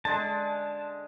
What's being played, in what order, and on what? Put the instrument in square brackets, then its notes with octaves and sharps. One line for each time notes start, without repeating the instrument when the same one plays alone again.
[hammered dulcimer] D3 G#3 [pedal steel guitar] A5